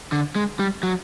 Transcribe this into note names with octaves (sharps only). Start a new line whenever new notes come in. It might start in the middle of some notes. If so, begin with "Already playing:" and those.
D3
G#3
G3
F#3